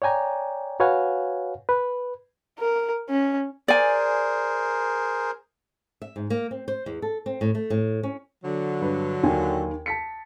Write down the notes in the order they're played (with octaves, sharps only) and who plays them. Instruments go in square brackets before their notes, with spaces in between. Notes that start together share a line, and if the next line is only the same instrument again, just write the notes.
[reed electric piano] C#5 D5 G5 G#5 A#5
F#4 B4 C#5 F5 F#5 G#5
B4
[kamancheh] A#4
C#4
[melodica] G#4 A#4 C5 [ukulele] D5 G#5
[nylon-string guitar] E5
G#2
A#3
C4
C5
E2
A4
C4
A2
A3
A2
C#4
[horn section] D3 F#3
[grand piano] G2 B4
D#2 D#3 G#5
A5 B6 C#7